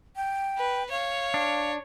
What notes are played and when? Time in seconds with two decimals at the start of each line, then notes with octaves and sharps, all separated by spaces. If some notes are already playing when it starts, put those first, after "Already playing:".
0.16 G5
0.58 B4
0.91 C#5 F5
1.34 D4